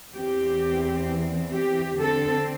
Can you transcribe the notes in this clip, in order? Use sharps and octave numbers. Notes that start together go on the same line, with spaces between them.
E2 E3 C4 G4
G4
D3 C4 A4